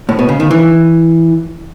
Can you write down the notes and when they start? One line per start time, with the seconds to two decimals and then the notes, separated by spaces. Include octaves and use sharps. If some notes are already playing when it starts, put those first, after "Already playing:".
0.09 A2
0.19 B2
0.29 C#3
0.40 D#3
0.51 E3